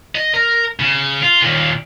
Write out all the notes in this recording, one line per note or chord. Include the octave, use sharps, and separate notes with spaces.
D#5
A#4
C#3
F4
D#2 A#2